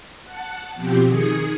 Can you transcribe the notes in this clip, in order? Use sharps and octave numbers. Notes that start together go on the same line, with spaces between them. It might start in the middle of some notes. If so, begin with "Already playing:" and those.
F#5 A5
B2 F3 C4 G4
D#3 G#4 D#6 G#6 C#7